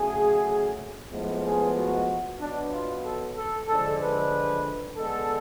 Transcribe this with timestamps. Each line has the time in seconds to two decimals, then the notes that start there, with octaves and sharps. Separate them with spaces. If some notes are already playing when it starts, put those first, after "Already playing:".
Already playing: C#3 F#3 A3 G#4
1.11 A2 F3 G#3 B3
1.43 G#4
1.75 F#4
2.39 B2 F#3 B3 D4
2.71 F4
3.03 A4
3.36 A4
3.67 D3 F3 G#3 A4
4.00 B4
4.96 D3 G#3 B3 A4